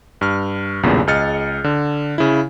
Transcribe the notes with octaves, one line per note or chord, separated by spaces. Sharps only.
G2 F6
B1 E2 G2 A#2 C#3
C#2 G#4 D#5 F6 A6 C#7
D3
C#3 E4